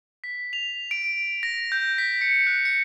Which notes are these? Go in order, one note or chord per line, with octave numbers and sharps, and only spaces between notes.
B6
F7
D7
A#6
G6
B6
C#7
F#6
C#7